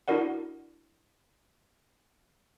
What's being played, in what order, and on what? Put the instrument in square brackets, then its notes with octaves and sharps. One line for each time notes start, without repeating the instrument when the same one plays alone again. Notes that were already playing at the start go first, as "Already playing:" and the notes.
[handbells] D4 E4 F#4 A#4 D5 F#5